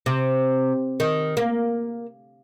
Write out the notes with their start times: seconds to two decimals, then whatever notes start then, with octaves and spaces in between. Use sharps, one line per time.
0.06 C3
1.00 D#3
1.37 A#3